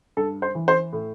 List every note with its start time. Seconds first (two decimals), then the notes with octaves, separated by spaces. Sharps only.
0.17 G2 A4
0.42 C5
0.55 E3
0.68 C5
0.93 A2